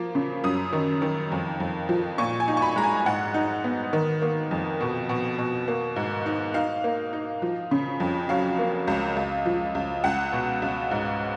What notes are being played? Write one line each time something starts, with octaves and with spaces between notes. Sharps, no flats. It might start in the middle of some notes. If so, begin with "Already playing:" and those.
Already playing: F3 A#3
C#3
F#2 D#6
D#3
D#3
F2
F2
F3
A#2 C#6
G#5
D#4
C#6
B5
G#3 A#5
G#5
G#2 F#5
D#4
B3
D#3
A#3
F2
B2
B2
B2
A#3
G#2
D#4
D#4 F5
A#3
D#4
F3
C#3
F2
F#3 F5
A#3
C#2
C#2
F3
C#2
C#2 F#5
B2
C#2
G#2